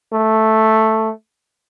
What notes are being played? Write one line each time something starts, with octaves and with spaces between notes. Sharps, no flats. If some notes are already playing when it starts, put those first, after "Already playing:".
A3